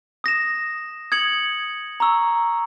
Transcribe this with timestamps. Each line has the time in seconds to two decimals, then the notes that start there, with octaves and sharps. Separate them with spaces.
0.24 D#6 A#6 E7
1.12 D#6 G#6 C#7 F#7
2.00 A#5 C#6 E6